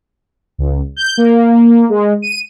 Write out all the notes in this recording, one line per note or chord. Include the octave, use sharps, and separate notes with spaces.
C#2
G6
A#3
G#3
D#7